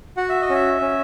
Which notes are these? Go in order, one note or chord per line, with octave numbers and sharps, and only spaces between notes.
F#4 F#5
E5
D#5
C#4 E5
C#4